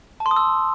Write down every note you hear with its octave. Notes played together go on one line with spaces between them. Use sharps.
A5
C6
D#6
E6